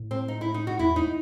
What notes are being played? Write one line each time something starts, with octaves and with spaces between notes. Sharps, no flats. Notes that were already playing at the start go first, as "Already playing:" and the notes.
Already playing: A2
C4
D#4
E4
D#4
F#4
E2 E4
D#4